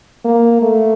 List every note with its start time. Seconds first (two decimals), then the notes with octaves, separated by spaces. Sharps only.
0.25 A#3
0.62 A3